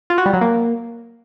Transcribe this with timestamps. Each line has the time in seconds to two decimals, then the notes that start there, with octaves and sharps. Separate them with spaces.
0.10 F4
0.18 F#4
0.26 G3
0.33 F#3
0.41 A#3